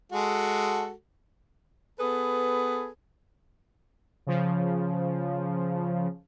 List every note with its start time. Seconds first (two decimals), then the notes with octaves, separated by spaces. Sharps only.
0.12 G#3 F#4 A4
1.99 B3 G#4 A4 B4
4.27 C#3 F3